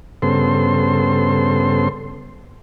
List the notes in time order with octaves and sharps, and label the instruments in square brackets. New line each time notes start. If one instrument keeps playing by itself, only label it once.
[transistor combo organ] G2 C#3 B3 A4 C5 C6